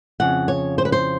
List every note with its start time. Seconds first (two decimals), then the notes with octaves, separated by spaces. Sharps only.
0.20 F2 C#3 F#5
0.48 C#5
0.78 C5
0.85 B4
0.92 C5